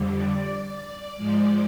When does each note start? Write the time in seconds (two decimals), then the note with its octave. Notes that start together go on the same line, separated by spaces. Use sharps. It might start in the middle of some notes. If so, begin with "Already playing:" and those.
Already playing: F2 D3 G3
0.14 D5
1.16 G#2 F3 G#3